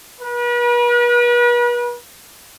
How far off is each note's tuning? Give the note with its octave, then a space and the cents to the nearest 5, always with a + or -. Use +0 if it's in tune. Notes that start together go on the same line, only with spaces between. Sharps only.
B4 -40